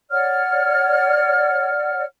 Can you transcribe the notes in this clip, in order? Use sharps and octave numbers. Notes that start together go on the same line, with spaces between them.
C#5 D5 F#5 F6